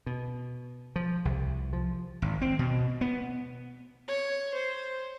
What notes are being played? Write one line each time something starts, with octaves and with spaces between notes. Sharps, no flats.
B2
F3
C2
F3
G#1
C4
B2
B3
C#5
C5